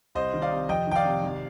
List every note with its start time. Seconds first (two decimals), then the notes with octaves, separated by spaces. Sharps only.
0.15 C2 C5 D#5
0.34 D#3
0.42 D5 F5
0.51 C3
0.69 F2 D#5 G5
0.87 D#3 G5
0.95 D5 F5
1.05 C3
1.23 G#1